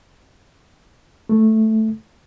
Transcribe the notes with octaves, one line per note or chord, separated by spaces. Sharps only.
A3